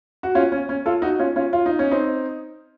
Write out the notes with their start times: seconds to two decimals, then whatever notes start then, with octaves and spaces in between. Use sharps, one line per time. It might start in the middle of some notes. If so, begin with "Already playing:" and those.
0.23 F#4
0.35 C#4 F4
0.52 C#4
0.69 C#4
0.86 F4 A4
1.02 D#4 F#4
1.19 C#4 F4
1.36 C#4 F4
1.53 F4
1.66 D#4
1.79 C#4
1.91 C4 D#4